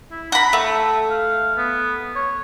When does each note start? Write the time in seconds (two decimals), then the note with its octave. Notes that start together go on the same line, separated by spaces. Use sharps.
0.11 E4
0.32 F#5 A#5 B5
0.53 A3 E6
1.10 F5
1.57 B3
2.15 C#5